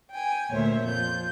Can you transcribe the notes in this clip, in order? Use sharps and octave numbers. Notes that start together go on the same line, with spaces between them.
G5 G#5
D2 A#2 C5 C#5 E5
F2 F4 G6